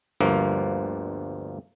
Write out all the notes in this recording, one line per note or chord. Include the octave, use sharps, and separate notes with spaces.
G1 D2 G2 F3 A#3